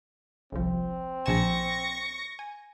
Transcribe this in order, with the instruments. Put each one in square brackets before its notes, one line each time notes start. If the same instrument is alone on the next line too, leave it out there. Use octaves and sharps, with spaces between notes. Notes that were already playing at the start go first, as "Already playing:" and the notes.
[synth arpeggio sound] G1 C2 F3 [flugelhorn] C4
[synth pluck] A#1 E7 [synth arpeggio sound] G#5 A5 [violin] C#6 A#6
[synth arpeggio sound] G#5